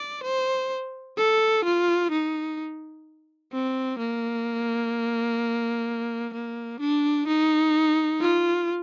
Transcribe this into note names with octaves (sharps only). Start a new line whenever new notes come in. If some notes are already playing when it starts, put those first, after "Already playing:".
Already playing: D5
C5
A4
F4
D#4
C4
A#3
A#3
D4
D#4
F4